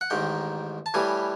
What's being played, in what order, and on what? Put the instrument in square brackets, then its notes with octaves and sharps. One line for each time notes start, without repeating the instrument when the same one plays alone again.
[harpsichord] F#5
A1 G#2 D#3 G5
A5
A2 E3 G3 G#5